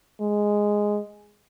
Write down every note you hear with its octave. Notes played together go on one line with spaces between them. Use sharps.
G#3